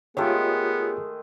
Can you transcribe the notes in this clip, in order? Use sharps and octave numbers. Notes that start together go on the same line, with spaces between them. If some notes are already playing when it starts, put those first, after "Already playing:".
D#3 G#3 A3 B3 F4 G4 G#4 C#5